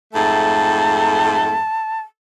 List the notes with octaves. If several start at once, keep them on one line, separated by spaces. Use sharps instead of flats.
F2 G#2 A3 A5